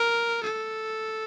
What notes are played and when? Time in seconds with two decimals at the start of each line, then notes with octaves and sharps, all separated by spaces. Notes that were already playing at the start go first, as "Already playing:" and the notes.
Already playing: A#4
0.44 A4